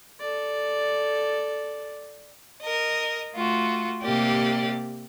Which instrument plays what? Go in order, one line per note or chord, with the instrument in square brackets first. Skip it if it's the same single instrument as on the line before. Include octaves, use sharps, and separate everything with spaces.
[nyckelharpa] A4 D5
[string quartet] A#4 D#5
A3 F4 F#4
C3 A#3 G4 D5